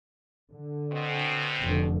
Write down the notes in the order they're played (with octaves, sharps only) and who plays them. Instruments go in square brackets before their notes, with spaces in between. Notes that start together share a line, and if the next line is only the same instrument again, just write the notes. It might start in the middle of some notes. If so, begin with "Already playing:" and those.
[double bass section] D3
[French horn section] B2 C4
[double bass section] F1 F2 D3